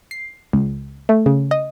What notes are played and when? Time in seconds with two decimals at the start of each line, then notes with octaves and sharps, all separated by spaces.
0.11 C7
0.53 C#2
1.09 A3
1.26 C#3
1.51 D#5